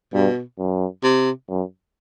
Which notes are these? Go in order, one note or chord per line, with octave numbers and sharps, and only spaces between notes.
G2 B2
F#2
C3
F#2